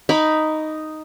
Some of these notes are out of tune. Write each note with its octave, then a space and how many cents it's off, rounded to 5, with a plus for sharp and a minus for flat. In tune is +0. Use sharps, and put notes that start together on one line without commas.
D#4 +0 B5 +0 D6 -30